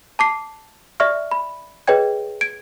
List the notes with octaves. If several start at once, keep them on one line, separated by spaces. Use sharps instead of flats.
A5 D6 C7
D5 E5 C#6 F6
B5
G#4 B4 C#5 D#5 G5 G#6
G#6 D7